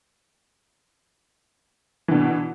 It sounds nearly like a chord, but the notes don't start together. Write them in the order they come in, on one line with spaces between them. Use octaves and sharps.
E3 D3 B2